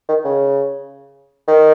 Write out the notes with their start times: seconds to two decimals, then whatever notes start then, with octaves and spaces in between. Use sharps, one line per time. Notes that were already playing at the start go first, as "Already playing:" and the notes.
0.08 D#3
0.24 C#3
1.48 D#3